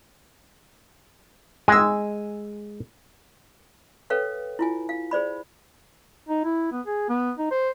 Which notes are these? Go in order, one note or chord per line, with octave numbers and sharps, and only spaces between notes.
G#3 G#5 E6
A4 B4 C#5 F5 G5
E4 F4 G#5
F5
G#4 C5 D5 B5
D#4
E4
B3
G#4
B3
D#4
C5